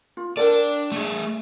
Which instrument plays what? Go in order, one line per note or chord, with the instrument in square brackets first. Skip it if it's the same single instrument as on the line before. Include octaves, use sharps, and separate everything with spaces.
[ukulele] F4
[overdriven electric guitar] D4 D5 [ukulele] A4 A#4 G5
[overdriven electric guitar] A3 G#4